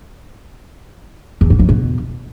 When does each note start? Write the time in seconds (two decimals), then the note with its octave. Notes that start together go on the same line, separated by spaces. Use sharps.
1.41 E2
1.50 G#2
1.59 F2
1.69 B2